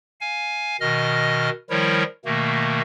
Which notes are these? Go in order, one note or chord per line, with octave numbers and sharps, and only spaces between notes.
F5 G#5
B2 D#3 D#5 F6
D#3 F3 G3 E4 A#4 C#5
B2 D#3 A3 A#3